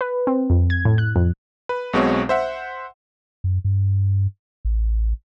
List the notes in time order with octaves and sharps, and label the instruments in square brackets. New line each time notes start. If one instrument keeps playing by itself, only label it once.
[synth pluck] B4
C4
F2
G#6
A2
F#6
F2
[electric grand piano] B4
B1 B2 G#3 C4 C#5 C#6
C5 E5 F#5
[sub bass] F#2
G2
A1